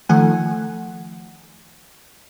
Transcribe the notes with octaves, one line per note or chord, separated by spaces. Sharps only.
D#3 F3 A3 F#5 G#5